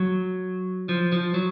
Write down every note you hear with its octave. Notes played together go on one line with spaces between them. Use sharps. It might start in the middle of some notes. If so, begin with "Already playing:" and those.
Already playing: F#3
F3
F3
F#3